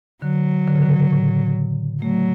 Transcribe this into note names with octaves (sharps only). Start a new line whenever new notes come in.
D3 F#3
D3
C#3
D3
A2
F#3 A3